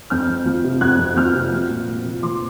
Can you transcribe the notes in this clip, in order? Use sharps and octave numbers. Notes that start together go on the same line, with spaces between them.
F2 F6 G6
F2
F3
C3
F2 F#6 G#6
F2
F3 F6 G6
C3
F3
A#2
A#2
F3
F3 C6 D6